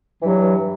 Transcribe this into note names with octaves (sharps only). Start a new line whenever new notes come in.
G2 E3 F#3